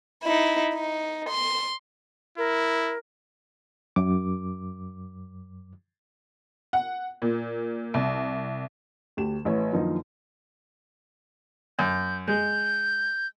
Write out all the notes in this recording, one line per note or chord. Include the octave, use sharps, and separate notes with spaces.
D#4 E4
D#4
C6
E4 A#4
F#2 D6
F#5
A#2
C2
D2 G4 E7
A1 E4 B4 C#5
F#2 D#3 F3 A#3 D4 D#4
F#2 G6
G#3 G6